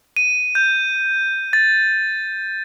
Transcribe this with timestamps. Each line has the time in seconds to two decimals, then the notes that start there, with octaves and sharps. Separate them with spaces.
0.17 D#7
0.55 G6
1.53 A6